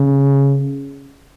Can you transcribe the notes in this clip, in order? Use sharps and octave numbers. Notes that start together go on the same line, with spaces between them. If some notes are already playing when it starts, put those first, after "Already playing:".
Already playing: C#3